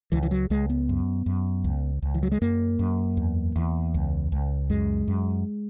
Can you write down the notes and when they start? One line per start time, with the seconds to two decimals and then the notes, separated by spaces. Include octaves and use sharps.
0.12 C#2 E3
0.23 E3
0.31 F#3
0.50 C#2 G#3
0.70 B3
0.89 F#2
1.26 F#2
1.64 C#2
2.02 C#2
2.14 E3
2.23 F#3
2.32 G#3
2.41 F#2 A#3
2.79 F#2
3.17 E2
3.56 E2
3.94 C#2
4.32 C#2
4.70 F#2 G#3
5.08 F#2